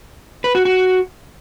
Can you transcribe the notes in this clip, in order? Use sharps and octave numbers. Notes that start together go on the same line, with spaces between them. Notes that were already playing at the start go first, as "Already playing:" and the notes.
B4
F#4
F#4